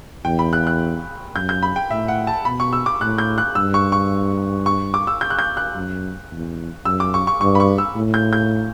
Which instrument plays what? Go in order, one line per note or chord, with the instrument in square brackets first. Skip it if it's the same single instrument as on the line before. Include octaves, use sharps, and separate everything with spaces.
[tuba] E2 [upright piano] G5
[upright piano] B5
F#6
F#6
[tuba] F#2 [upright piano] G6
[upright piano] G6
B5
G5
[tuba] A2 [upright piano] E5
[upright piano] F#5
A5
[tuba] B2 [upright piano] B5
[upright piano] C#6
E6
D6
[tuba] A2 [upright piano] F#6
[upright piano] G6
F#6
[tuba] G2 [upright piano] E6
[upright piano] C#6
C#6
C#6
D6
E6
G6
F#6
G6
F#6
[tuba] F#2
E2
[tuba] F#2 [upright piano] E6
[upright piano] D6
C#6
C#6
[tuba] G2 [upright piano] C#6
[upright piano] B5
C#6
E6
[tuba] A2
[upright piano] G6
G6